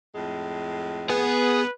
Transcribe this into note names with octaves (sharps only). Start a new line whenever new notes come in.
F2 A2 G#3
B3 G#4 B4